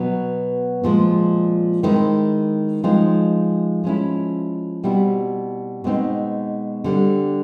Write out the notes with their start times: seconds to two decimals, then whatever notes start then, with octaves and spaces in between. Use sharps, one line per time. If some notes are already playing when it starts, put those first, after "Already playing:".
Already playing: B2 F#3 B3
0.83 A#2 F3 G#3
1.83 D#3 G#3 C4 E4
2.84 F3 G#3 C4 D#4
3.84 F3 G#3 C#4 E4
4.84 B2 G3 C4 E4
5.84 B2 G#3 C4 D#4
6.84 D3 G3 C4